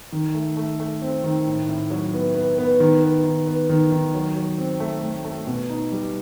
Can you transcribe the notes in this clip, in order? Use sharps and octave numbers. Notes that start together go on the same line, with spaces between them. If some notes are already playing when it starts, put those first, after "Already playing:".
D#3
A3
A3
A3
C4
D#3
A2
A2
F#3
B3
B3
B3
D#3
B3
D#3
B3
D#3
D#3
F#3
F#3
C4
A3
A3
A3
B2
D#4
G3